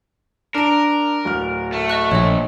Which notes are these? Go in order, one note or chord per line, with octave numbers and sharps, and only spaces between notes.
D4 A#4 A5 D7
D1 F6
A3
D#5 C#6 F#6
A#1 C#5 D#5